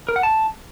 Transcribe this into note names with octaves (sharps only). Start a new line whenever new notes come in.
A#4
F#5
A5